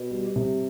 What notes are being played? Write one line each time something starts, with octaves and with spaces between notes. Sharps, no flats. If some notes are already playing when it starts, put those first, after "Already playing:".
Already playing: B2
G3
C3